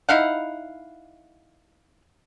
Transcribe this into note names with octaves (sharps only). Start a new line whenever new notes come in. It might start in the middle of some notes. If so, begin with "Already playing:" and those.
D#4 E4 F5 F#5